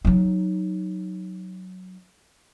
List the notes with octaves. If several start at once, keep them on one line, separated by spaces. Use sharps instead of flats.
F#3 D#4